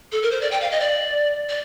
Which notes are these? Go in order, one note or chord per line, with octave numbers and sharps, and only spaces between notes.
A4
A#4
C5
D5
G5
F5
D#5
D5
D5